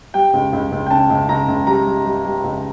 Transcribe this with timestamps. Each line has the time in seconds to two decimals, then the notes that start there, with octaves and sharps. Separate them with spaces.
0.14 G3 G5
0.34 C#2
0.53 C#2
0.72 C#2
0.87 G5
0.90 C#3 A5
1.10 C#2
1.29 C#2 A#5
1.48 C#2
1.67 G3 A#5
1.86 G3
2.05 G3
2.25 G3
2.44 C#2